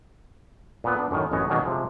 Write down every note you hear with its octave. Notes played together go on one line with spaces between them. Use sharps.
A#2 B3
B3 D4
F#2 A2 D#3
A1 F#2 B3 C#5 D#5 G#5
B2 D#3 F#3 D4 G#4
C3 F3 G#3